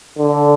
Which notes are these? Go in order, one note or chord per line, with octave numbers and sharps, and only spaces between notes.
D3